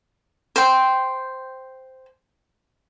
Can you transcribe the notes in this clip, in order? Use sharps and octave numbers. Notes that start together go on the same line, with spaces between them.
C5 G5